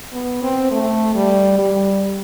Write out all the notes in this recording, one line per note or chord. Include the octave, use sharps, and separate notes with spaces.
B3
C4
A3
G3
G3